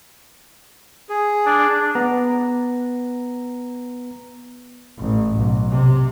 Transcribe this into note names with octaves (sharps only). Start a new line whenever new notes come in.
G#4
D4
B3 A#5
A1
B1
C3